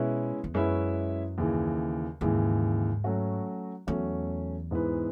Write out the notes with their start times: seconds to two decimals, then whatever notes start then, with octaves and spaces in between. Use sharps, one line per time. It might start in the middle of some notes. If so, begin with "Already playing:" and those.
Already playing: B2 G#3 C#4 E4 B4 E5
0.44 E2
0.54 F#2 G#3 C#4 E4 B4 E5
1.38 D#2 C#3 E3
2.21 D#2 G#2 C#3 E3
3.04 F#3 A3 C#4 F#4
3.87 E2 F#3 A3 C#4 F#4
4.71 G#2 E3 B3 E4 B4